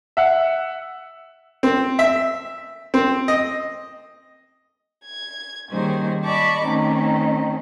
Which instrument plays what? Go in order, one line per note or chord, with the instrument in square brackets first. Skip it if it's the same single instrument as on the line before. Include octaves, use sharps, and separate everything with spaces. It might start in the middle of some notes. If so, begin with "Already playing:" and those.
[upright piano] E5 F#5
[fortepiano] C4
E5
C4
D#5
[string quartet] G#6
D#3 G3 A#3 C#4 G#4 C5
D5 D#5 A5 B5 C#6 D6
D#3 A3 C4 C#4 D#4